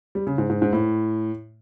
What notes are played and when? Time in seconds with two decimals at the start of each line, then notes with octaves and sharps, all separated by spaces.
0.15 G3
0.27 C#3
0.38 G#2
0.50 G#2
0.62 G#2
0.73 A2